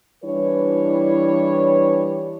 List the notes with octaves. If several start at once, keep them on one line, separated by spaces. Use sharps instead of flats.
E3 G3 D4 E4 B4 C#5